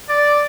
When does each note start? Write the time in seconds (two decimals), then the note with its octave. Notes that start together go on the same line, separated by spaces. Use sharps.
0.09 D5